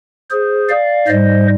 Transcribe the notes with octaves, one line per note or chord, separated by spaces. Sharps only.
G#4 C5
D5 F5
G#2 G3 C5 D#5